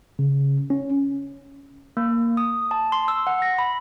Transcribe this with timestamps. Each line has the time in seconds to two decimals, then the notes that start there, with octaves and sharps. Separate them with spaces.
0.19 C#3
0.70 C#4
1.97 A#3
2.37 D#6
2.71 A5
2.92 C6
3.08 E6
3.27 F#5
3.42 A#6
3.58 B5